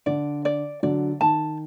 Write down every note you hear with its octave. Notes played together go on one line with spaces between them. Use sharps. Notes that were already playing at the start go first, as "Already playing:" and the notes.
D3 D5
D5
D3 F#3 D5
D#3 A5